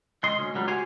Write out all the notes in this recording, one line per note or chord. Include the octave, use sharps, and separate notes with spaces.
C#2 D#5 C6
D2 C#4
C#2 F#3 G3
F#4 G4 C5 F5 G5 G#5